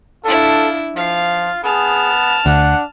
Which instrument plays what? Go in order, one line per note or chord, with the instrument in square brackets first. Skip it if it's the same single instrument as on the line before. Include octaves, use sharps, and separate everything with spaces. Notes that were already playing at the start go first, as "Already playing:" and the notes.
[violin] D4 E4 [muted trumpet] F4 [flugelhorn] A4
[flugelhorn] F3 [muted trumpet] F4 [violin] F5 C7
[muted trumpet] B3 [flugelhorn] G#4 [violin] A5 F6
[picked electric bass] D2 [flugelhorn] D4 [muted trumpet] F#5